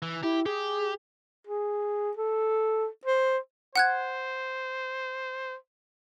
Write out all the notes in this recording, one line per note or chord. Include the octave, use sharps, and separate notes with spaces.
E3
E4 G4
G4 G#4
G#4
A4
C5
C5 F#5 F#6 G#6